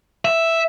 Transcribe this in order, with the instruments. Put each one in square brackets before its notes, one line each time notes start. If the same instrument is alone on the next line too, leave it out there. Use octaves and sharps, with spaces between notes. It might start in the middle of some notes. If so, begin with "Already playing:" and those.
[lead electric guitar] E5